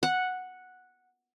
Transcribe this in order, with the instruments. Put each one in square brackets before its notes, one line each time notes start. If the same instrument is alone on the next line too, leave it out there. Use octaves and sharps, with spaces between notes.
[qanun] F#5